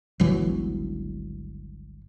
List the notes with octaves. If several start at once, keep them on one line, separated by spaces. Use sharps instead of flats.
G1 C#2 E3 F#3